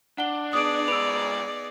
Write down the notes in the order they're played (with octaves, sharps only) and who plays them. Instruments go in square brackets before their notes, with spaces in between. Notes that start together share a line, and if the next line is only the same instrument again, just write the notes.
[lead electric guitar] D4 [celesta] F#5 G7
[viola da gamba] B3 D#4 G#4 [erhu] D5 [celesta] D#6 D7
[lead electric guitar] G#2 B4 [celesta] E6 D7 F7